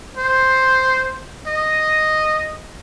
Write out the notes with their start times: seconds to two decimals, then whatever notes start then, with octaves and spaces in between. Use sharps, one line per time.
0.17 C5
1.47 D#5